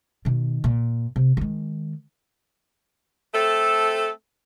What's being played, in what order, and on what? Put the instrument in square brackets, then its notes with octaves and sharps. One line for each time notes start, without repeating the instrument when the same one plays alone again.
[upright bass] B2 D#3
A#2
C3
D#3 G#3
[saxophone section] A3 C4 A4